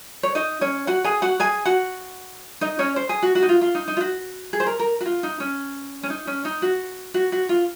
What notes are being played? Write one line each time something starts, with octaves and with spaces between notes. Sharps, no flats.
C#5
D#4 D#5
C#4 C#5
F#4 F#5
G#4 G#5
F#4 F#5
G#4 G#5
F#4 F#5
D#4 D#5
C#4 C#5
C5
G#4
F#4
F#4
D#4
F4
F4
D#4
D#4
F4
F#4
G#4
C5
A#4
A#4
F#4
F4
D#4
C#4
C#4
D#4
C#4
D#4
F#4
F#4
F#4
F4